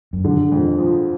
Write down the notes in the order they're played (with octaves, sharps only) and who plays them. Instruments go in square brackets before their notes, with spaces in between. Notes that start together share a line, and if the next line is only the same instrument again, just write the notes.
[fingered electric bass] F#2
[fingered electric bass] G2 [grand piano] D3
[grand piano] F2
F3